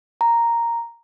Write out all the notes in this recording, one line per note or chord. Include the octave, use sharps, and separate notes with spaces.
A#5